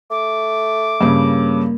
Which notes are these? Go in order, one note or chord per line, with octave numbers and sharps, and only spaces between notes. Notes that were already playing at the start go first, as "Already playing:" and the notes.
A3 D6
G2 C#3 A#3